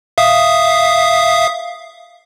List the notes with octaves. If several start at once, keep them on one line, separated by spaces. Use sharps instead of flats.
E5 F5 D#6